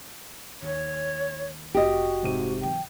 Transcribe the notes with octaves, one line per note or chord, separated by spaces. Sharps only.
D#2 C#5
F1 F#4 G4 D#5
G#2 C3 D#7
E3 F#3 G5